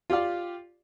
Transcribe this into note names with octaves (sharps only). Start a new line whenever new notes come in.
F4 G4 D5 F5